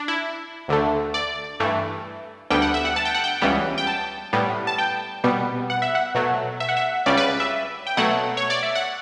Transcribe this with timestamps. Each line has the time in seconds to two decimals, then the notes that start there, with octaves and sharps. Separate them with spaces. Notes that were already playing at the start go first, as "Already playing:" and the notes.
Already playing: D4
0.08 E4
0.68 D2 D3 A3
1.14 D5
1.60 G2 E3 A3
2.50 D2 D3 G3 B3 G5
2.62 F#5
2.74 E5
2.85 F#5
2.96 A5
3.05 G5
3.14 F#5
3.24 G5
3.42 C#2 C#3 E3 G3 B3
3.78 G5
3.87 A5
4.33 A2 G3 B3
4.67 A5
4.78 G5
5.24 B2 G3 B3
5.70 F#5
5.82 E5
5.95 F#5
6.15 B2 F#3 A3
6.60 E5
6.69 F#5
6.77 E5
7.06 C#2 C#3 G3 D5
7.17 B4
7.40 E5
7.87 G5
7.97 B2 F#3 A3 F#5
8.37 C#5
8.50 D5
8.63 E5
8.75 F#5